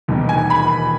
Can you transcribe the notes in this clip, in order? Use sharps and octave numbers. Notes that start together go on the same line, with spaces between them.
E1 D#2 D#3
G#5
B5